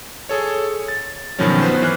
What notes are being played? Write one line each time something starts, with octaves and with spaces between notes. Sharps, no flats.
G#4 A4 C#5
A6
G2 B2 D#3 F3 F#3 C#4
B3 B4 C5
E3 F6 F#6